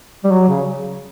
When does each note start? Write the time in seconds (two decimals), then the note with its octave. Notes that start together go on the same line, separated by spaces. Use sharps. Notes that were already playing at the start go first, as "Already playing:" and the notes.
0.24 G3
0.32 F#3
0.49 C#3